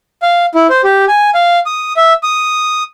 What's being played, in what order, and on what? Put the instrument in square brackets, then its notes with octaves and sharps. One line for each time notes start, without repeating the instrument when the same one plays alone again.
[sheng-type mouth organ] F5
E4
C5
G4
G#5
F5
D#6
E5
D#6